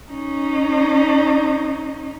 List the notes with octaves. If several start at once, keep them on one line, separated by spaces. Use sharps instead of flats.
C#4 D#4